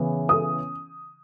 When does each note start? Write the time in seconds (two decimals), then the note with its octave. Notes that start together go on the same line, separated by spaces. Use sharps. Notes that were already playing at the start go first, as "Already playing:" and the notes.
Already playing: C#3 E3 B3
0.29 D#6